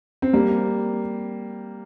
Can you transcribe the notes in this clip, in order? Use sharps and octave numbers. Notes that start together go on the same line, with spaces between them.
C4
G3 A#3